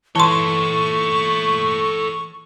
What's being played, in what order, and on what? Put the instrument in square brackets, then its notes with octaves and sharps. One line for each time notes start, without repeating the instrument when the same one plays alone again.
[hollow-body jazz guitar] E3 [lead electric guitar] A4 C#5 [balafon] A5 C6 [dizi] C#6